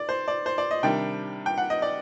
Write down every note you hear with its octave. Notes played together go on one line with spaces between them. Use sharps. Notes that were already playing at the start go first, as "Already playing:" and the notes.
Already playing: D5
C5
D5
C5
D5
D#5
C3 D#3 G3 D4 G5
G5
F#5
D#5
D5